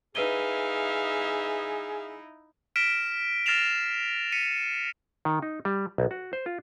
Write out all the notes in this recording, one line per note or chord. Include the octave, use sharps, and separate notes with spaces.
D#4 E4 G#4 B4 E5 F5 D#7 G7
F6 A#6 B6 D7 E7
F6 A6 A#6 C7 E7 F7
B6 C#7 D#7
D#3
D#4
G3
B1
F#4
C5
F4